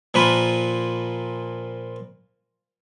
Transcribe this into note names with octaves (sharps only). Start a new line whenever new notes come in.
A#2 F3 A#3 B4